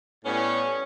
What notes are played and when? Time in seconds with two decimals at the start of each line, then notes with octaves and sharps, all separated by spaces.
0.25 A2 G3 B3 C#4